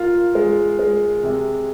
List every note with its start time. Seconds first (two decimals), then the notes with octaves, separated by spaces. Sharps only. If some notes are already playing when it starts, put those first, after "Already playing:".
Already playing: F4 A#4
0.35 G#3
0.79 G#3
1.23 C3